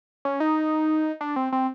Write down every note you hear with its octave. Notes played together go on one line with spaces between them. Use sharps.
C#4
D#4
D4
C4
C4